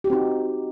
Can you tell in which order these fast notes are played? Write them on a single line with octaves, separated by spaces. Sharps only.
G4 F#4 C4 D#4